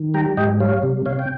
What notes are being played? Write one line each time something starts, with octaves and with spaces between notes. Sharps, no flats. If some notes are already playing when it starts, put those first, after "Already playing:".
Already playing: D#3
G3 G5 A#5
G#2 D#5 G5
G3 C#5 F5
C3
C3 C#5 F5
G5